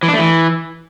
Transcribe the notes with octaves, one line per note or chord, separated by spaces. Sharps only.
E3
D4
A3
E3